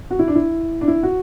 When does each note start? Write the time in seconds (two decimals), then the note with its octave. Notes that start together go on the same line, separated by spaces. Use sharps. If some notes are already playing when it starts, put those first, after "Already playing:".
0.11 F#4
0.19 E4
0.28 D4
0.35 E4
0.81 D4
0.88 E4
1.03 F#4